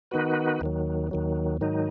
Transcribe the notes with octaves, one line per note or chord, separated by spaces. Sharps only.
D#3 B3 D#4 F#4 B4
D#2 D#3 F#3
D#2 D#3 F#3
G#2 D#3 F#3 D#4